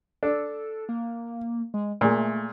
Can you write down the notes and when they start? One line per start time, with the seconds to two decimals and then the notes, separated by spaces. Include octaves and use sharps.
0.23 D4 A4
0.89 A#3
1.74 G#3
2.01 A#2 G#3 A3